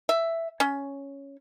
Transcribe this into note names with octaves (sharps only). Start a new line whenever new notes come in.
E5
C#4